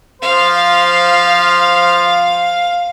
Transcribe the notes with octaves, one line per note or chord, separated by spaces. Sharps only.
F3 C5 F5